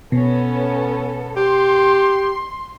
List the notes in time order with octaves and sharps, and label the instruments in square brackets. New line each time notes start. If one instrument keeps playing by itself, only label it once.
[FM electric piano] B2 [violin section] B3 C#4 A4
[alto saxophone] G4 [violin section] C6